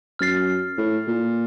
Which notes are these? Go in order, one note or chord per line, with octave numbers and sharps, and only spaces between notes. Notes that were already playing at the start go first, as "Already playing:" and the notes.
F#2 F6 A6 C7
A2
A#2